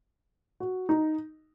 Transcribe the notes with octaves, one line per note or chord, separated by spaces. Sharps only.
F#4
D#4